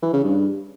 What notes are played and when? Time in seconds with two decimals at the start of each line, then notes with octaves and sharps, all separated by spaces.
0.02 E3
0.13 C#3
0.24 G2